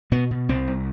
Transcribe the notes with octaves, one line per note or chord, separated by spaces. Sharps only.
B2 B3
B2
C2 C4
C2